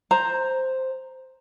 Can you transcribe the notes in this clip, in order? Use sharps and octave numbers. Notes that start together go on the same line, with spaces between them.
C5 A#5